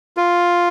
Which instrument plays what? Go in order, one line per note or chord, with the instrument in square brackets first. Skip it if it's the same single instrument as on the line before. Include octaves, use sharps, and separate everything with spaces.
[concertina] F4